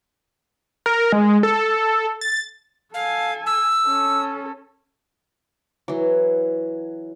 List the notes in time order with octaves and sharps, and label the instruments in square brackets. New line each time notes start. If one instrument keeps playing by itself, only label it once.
[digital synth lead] A#4
G#3
A4
A6
[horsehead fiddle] A4 G#5 [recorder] F5
[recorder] E6
[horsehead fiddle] C#4 A4
[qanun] E3 F#3